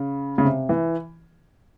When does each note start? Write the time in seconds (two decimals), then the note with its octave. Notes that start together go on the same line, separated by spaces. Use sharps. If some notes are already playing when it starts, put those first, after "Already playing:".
Already playing: C#3
0.38 C#3
0.44 C3
0.69 E3